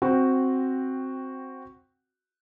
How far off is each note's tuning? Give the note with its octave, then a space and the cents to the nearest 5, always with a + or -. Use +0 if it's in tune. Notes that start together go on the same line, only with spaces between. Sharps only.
C4 +5 F#4 +0 G5 -5